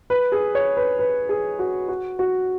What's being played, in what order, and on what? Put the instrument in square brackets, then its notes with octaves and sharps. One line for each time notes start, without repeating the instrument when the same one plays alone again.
[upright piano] B4
G#4
C#5
B4
B4
G#4
F#4
F#4
F#4